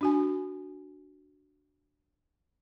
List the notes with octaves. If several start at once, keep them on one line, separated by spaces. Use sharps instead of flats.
D4 F#4 G#5